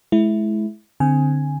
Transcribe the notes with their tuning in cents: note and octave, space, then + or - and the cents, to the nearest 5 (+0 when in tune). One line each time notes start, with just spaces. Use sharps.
G#3 +40 E4 +0
D3 +0 C4 +0 G#5 +0